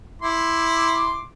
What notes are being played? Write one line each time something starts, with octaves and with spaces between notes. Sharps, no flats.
E4 C6 D6